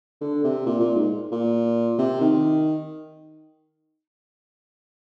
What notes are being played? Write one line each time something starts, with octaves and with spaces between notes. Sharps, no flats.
D3
C3
A#2
A#2
G#2
A#2
C3
D#3